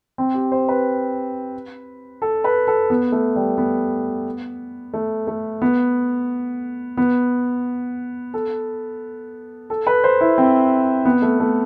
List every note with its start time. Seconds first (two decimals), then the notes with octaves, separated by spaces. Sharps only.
0.18 C4
0.34 G4
0.52 C5
0.68 B4
2.22 A4
2.44 B4
2.67 A4
2.90 B3
3.12 A3
3.36 G3
3.58 B3
4.94 A3
5.27 A3
5.62 B3
6.97 B3
8.34 A4
9.70 A4
9.87 B4
10.04 C5
10.21 E4
10.38 C4
11.05 B3
11.22 A3
11.40 A3